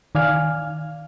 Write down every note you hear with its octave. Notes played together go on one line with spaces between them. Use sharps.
D#3 D5 F5 G#5 F6